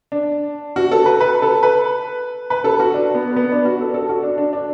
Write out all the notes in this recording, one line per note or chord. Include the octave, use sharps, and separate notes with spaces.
D4
F#4
A4
B4
B4
A4
B4
B4
A4
F#4
D4
B3
B3
D4
F#4
A4
A4
F#4
D4
D4
D4